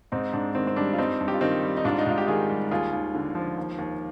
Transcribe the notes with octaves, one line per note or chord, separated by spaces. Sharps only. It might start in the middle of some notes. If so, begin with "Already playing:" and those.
G#2 C4 D#4
G#2 D4
D#3 C4
C4
G3 D4
F4
G2 C4 D#4
G2
G4
F4
D#3 C4 D#4
G3
D#4
G#2 D4 F4
D#4
G#2 F4
G4
D#3 F4 G#4
G3
D#2 F4 G#4
D#2
D3
F3
D#2
D#2